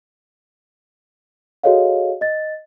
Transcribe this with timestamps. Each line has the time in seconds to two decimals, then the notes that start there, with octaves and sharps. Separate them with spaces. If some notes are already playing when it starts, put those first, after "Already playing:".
1.64 F#4 G#4 A4 C#5 D#5 F5
2.21 D#5 A6